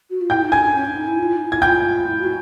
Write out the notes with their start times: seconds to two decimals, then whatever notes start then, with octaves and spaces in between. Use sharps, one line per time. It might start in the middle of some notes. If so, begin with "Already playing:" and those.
0.10 F#4
0.21 F4
0.30 E4 G5 G6
0.41 D#4
0.52 D4 G#5 G#6
0.63 D4
0.74 C#4
0.85 D4
0.96 D#4
1.07 E4
1.18 F4
1.36 D#4
1.47 E4 G#6
1.62 F4 G5 G6
2.06 E4
2.20 F#4